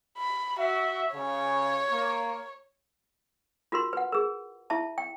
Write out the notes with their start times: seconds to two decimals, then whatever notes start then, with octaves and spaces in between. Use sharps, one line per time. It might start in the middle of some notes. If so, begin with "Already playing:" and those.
0.18 B5
0.59 F#4 E5
1.15 C#3 C#5
1.91 A#3
3.72 F4 F#4 A#4 C6
3.93 B4 F#5
4.12 G#4 A#4
4.70 E4 E5 A5
4.98 G5